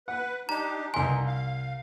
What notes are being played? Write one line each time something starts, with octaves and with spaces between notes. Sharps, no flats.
B4 F#5
D4 D#4 G4 A#5
C2 G2 D#4 G#5 C6
F5